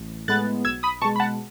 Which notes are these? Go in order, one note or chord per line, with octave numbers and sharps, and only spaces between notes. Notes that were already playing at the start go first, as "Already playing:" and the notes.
Already playing: A1
A2 G#3 B3 F#6 A6
B1 E6 G#6
B5 D#6
B2 G#3 A5 C#6
B5
F#5 A5